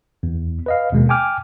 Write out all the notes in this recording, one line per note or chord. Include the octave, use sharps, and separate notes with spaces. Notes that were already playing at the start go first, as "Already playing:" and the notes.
E2
B4 D#5 F5
D#2 B2 G#3 A#3
G5 G#5 D6 F6